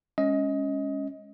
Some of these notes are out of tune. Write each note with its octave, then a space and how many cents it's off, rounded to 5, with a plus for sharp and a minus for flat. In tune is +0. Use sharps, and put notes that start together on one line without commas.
G#3 -15 C#4 +0 D#5 +20